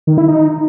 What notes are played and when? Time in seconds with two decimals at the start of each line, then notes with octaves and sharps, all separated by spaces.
0.07 D#3
0.18 E4
0.28 D#4